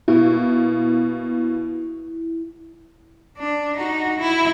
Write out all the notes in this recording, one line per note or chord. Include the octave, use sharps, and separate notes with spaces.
B2 A#3 E4
D4
D#4 F#4
E4